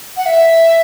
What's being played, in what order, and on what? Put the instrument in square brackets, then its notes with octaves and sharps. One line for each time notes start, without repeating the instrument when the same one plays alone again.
[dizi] F#5
E5